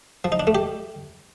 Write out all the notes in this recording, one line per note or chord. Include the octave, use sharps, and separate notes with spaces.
F3
D#4
D4
A3
G4